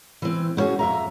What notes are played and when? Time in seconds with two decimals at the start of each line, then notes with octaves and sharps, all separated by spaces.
0.22 E3 C4
0.57 B3 C#4 F#4 G#4
0.79 F2 E5 A#5